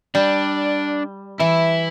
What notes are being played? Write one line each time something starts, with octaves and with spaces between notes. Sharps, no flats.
G3 D4
E3 E4